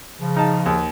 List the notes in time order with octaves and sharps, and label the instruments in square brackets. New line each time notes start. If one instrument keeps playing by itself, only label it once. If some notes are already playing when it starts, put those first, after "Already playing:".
[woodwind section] C#3 F3
[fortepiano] D#4 A5
D#2